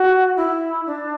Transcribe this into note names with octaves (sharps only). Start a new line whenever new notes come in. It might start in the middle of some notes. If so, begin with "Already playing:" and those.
Already playing: F#4
E4
D4